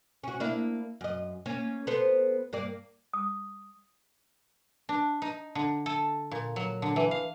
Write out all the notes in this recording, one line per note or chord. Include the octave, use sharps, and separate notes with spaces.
C#4 F#4
A#3 D4 E4
F#2 D#5
A#3 C#4
B3 A4 C5
G2 A#3 D5
D#6
D4
D#4
D3
A4
A#2
F#3
D3
E3
F5